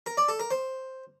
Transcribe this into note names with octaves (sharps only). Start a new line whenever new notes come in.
A#4
D5
A4
A#4
C5